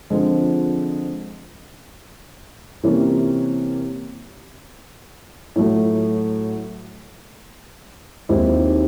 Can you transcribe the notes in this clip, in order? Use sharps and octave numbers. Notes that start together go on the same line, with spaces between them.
D3 F3 G#3 C4
C3 E3 G3 A#3 C#4
A2 F#3 A3
D#2 D#3 G#3 C4 E4